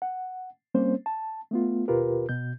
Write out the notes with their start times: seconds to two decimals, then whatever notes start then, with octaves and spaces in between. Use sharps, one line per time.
0.02 F#5
0.74 G3 A#3 C4 C#4 C5
1.06 A5
1.51 A3 B3 F4
1.88 D#2 B2 F4 G4 A#4 B4
2.29 B2 G6